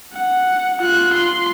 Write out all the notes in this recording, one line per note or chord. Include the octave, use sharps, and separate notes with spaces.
F#5
F4 F#6
C6